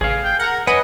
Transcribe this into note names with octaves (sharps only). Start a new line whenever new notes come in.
A1 G#4 F5
G5
A#4 F#5 A#5
B4 C#5 D#5 F#5 G#5